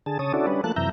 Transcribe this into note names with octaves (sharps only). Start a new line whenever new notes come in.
D3 G#4 A5
C#3 C#5 A5 D#6
C#4 D4 E4 F#4 A4 D5
G3 C#4 D4 B4
F3 A3 A#3 A5 F#6
F#2 C3 E3 E5 A#5 G6